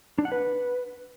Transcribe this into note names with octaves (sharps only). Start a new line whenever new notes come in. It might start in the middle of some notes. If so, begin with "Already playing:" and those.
D4
F#5
B4